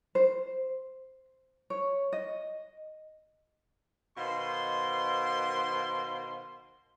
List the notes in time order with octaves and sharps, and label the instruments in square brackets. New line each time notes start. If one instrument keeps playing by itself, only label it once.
[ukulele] C5
C#5
D#5
[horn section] B2 D#3 C5 F5 C6